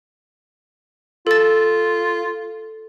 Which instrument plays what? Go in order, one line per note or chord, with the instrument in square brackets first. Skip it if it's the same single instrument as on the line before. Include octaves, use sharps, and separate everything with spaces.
[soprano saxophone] F4 [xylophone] A4 A6